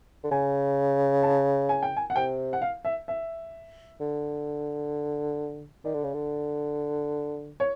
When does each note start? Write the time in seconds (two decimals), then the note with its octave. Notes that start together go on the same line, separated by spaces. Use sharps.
0.24 D3
0.31 C#3 G#5
1.23 A5
1.69 G#5
1.83 G5
1.97 G#5
2.10 F#5
2.16 C3 G5
2.53 F#5
2.62 F5
2.85 E5
3.08 E5
4.00 D3
5.85 D#3 D5
5.94 D3
6.04 C#3
6.14 D3
7.60 C#5